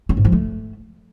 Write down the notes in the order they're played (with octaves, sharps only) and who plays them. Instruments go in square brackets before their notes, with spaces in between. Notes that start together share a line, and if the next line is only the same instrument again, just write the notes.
[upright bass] C#4
G#2
F3
A3